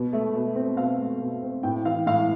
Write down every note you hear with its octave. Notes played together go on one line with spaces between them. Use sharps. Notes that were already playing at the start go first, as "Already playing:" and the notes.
Already playing: B2
A3
B2
C4
B2 F5
A3
B2
C4
A2 G5
E3 F5
A2 F5